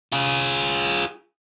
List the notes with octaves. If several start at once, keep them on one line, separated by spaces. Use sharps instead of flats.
F4 G#4